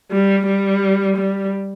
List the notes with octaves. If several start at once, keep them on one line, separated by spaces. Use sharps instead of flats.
G3
G3
G3